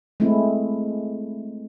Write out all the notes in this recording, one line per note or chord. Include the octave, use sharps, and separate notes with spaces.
G#3 A3 C4 E4